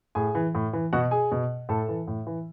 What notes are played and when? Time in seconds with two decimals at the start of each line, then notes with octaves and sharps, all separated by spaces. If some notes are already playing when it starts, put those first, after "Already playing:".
0.15 A2 G#4 G#5
0.35 E3
0.55 A2
0.73 E3
0.93 B2 F#4 F#5
1.11 G#4 G#5
1.32 B2
1.69 A2 A4 A5
1.89 E3
2.08 A2
2.27 E3